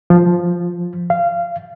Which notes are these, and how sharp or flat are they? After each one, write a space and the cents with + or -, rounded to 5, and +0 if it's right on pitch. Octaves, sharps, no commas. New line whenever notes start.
F3 +0
F5 -20